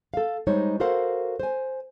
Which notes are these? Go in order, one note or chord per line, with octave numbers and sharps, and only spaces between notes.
A4 F5
G3 G#3 D#4 C5 C#5
F#4 A4 A#4 C5 F5 F#5
C5 G#5